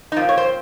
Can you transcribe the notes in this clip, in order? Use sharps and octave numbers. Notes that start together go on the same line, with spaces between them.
D#4
A#2 F3 C4 F4
C#5
C5